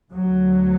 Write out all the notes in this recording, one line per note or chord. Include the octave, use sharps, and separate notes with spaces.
D2 F#3